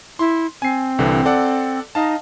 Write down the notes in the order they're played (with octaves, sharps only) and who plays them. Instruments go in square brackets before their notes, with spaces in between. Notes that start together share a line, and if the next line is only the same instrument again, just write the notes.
[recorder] E4 [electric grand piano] C6
[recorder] C4 [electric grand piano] G#5 C7
[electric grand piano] C2 D3 E3
A4 D5 F#5
[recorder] D#4 [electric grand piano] D#5 F5 A5